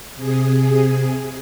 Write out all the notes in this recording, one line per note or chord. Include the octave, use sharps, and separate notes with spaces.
C3 G#4